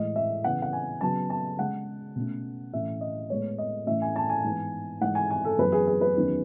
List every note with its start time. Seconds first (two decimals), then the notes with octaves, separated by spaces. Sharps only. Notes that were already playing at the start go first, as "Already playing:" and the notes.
Already playing: A2 E3 G#3 D#5
0.16 E5
0.44 C#3 E3 B3 F#5
0.62 F#5
0.73 G#5
1.01 C#3 F#3 B3 A5
1.30 A5
1.58 C#3 G#3 C#4 F#5
2.15 B2 A3 C#4
2.73 A2 E3 A3 C#4 E5
3.01 D#5
3.30 A2 G#3 B3 C#5
3.58 D#5
3.87 A2 E3 A3 C#4 E5
4.02 G#5
4.16 A5
4.29 G#5
4.44 G#2 E3 B3
5.01 G#2 E3 G#3 F#5
5.15 G#5
5.30 G#5
5.45 A4
5.58 F#2 E3 B3 B4
5.72 G#4
5.87 G#4
6.01 B4
6.16 E2 D#3 F#3 C#4